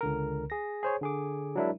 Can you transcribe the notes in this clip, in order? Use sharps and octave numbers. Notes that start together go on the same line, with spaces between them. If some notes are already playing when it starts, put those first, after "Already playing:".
C#2 D3 A#4
G#4 A#6
G#4 C5 C#5
D3 G#4 D6
F#3 G#3 D4 E4 A#4 E5